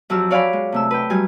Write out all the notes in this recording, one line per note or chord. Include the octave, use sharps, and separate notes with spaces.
F2 F#3 F#4 G4 E6 F6
C#5 D5 F5 F#5 G#5 B5
G#3
C3 A3 E6
B4 G5
F#3 G3 G#5